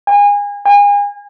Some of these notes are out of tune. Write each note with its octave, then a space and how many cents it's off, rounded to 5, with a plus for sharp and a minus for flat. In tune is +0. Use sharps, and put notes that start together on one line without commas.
G#5 -30
G#5 -35